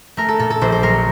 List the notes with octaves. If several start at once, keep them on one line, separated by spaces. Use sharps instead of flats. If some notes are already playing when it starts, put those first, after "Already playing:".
A3 A#4
A4
A#2 A4
A4
A#1 C5
C5
F#3 A#4